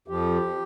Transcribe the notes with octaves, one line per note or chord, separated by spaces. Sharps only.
F2 F3 G4